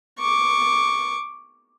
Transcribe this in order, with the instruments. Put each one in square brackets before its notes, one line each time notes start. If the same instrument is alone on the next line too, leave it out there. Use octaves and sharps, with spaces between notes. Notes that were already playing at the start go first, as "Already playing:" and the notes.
[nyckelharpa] C#6 D6